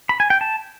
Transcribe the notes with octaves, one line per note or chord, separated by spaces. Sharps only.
B5
G#5
G5
A5